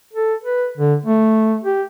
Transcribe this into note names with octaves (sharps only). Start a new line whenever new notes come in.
A4
B4
D3
A3
G4